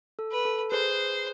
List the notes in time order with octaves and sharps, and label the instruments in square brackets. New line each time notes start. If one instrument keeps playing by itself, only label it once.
[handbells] A4
[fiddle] B4
[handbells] A4
[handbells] G#4 B4 [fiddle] C5